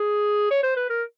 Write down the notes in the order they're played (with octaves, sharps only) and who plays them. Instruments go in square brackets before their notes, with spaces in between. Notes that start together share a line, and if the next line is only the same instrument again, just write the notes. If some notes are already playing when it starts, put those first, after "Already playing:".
Already playing: [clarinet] G#4
C#5
C5
B4
A#4